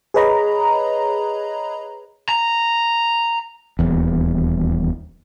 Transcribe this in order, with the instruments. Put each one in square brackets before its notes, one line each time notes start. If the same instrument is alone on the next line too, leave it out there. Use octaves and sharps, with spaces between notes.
[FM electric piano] G#4 B4 C#5 D#5 A#5 B5
[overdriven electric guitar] A#5
[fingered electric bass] D#1 E2